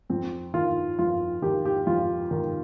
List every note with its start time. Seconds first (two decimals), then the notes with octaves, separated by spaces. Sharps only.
0.10 F2 C4
0.54 D#3 F4
0.99 F2 F4
1.42 D#3 G4
1.65 G4
1.87 F2 F4
2.31 D#3